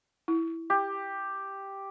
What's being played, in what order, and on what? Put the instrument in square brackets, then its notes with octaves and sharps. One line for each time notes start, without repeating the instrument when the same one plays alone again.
[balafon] E4
[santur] G4